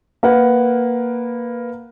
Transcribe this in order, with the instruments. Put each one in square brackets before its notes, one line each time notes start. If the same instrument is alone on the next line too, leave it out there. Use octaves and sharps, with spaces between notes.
[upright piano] A#3 A#4 B4 F#5